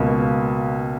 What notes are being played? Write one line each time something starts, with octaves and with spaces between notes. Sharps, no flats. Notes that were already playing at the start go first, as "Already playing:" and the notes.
Already playing: C#2 B2 A#3